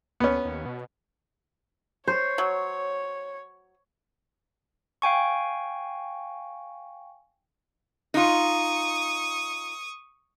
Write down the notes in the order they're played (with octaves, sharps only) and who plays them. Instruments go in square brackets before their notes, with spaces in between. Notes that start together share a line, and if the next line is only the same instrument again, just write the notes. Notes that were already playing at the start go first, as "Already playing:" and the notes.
[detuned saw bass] D2 [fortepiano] B3 C#4
[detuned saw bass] D#2
B2
[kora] C5 [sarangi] C#5
[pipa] F#3
[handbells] F5 G5 G#5 C#6
[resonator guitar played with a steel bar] D#4 F4 [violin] C#6 D#6